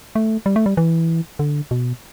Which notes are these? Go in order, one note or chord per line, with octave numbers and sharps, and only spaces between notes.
A3
G3
A3
G3
E3
D3
B2